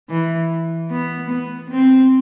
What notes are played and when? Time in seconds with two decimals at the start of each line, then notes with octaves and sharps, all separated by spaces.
0.10 E3
0.91 B3
1.30 B3
1.71 C4